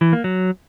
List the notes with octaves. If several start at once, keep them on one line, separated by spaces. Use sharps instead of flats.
E3
A#3
F#3